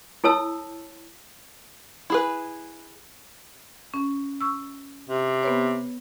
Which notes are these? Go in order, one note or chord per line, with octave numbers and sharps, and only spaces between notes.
E4 A4 C#5 A5 E6
E4 G#4 B4
C#4
C#6 E6
C3
B3 B4 C#5